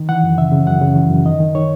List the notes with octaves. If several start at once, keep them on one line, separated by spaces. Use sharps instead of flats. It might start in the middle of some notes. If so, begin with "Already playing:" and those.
Already playing: D#3
E3 F#5
F#2
C#3 E5
C#3
F#2 F#5
C#3
E3
F#2
D#3 D#5
D#3
D#3 C#5